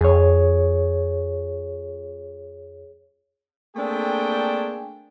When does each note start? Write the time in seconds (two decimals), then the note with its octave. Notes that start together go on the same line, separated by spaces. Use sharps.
0.01 F2 G#4 C#5
3.75 A3 A#3 C4 D4 G#4 G5